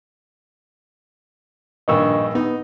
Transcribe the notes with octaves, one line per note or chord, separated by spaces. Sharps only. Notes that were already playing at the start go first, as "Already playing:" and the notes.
A#1 G2 D#3 D#5 C#6 E6
B3 D#4